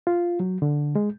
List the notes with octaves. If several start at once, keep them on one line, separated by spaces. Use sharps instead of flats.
F4
F#3
D3
G#3